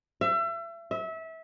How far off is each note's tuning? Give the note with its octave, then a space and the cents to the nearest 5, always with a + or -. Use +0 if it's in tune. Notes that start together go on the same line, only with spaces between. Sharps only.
E5 +35
E5 -25